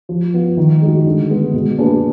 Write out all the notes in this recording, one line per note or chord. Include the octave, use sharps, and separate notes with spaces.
F3
B3 F4
D#3
G#3 D#4 F#4
D3
G#3 B3
B2
A#3 D4 G#4 B4